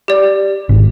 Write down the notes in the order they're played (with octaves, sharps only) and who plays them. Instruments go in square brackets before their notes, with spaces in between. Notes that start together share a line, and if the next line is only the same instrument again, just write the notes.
[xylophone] G4 D5
[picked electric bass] G#1